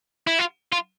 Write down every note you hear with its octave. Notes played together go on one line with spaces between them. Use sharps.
E4
F4
F4